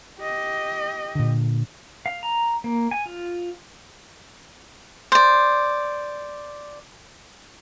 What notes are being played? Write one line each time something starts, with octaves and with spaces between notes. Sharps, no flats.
G4 D#5
A#2 D3
F5
A#5
A#3
G#5
F4
C5 D5